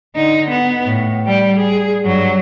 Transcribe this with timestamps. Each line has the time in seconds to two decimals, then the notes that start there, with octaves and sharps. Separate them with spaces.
0.15 D3 D#4
0.50 B3
0.85 A2
1.26 G3 G5
1.56 G#4
2.04 G2 F#3